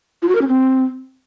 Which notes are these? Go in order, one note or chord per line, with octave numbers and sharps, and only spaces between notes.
F4
F#4
A#4
C#4
C4